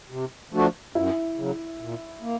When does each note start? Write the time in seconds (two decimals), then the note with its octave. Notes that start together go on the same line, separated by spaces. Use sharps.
0.10 C3
0.53 F3 A3 D4 F#4
0.95 F#2 E4
1.36 C#3 F#3
1.80 A#2
2.22 A#3